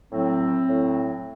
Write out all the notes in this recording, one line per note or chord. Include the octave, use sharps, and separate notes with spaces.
A2 F#3 C4
A2 F#3